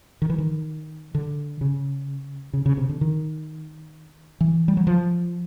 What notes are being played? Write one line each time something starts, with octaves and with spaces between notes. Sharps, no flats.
D#3
E3
D#3
D3
C#3
C#3
C#3
C3
D3
D#3
E3
G3
F#3
F3